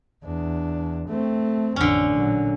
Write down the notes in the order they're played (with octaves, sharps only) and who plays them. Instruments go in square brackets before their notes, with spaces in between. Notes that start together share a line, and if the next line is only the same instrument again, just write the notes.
[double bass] E2 D4
A3 C4
[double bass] A1 F2 [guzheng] D3 C#4
[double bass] A#2 F#3